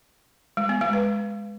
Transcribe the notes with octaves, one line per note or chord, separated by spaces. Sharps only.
G#3
B3
G#3
B4